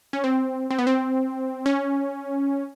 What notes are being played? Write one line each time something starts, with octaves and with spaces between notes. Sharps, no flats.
C#4
C4
C4
B3
C4
C#4